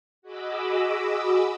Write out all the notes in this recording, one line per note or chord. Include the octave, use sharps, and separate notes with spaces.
F#4 G#4 D#5 B5 D6 E6